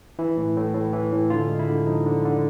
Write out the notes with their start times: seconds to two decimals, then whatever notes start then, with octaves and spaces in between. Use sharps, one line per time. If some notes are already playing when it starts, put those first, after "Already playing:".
0.19 E3 E4
0.37 A2
0.56 A2
0.74 A2
0.93 E3
1.12 A2
1.30 D3 F4
1.49 G#3
1.59 E4
1.68 D3
1.87 F3 D#4
2.06 D3
2.25 D3